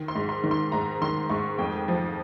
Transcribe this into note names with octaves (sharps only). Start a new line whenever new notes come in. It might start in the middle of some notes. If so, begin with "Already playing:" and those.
Already playing: D#3
C6
G#2
C6
D#3
C6
G#2 A#5
D#3 C6
G#2 C#6
F2 G5
F3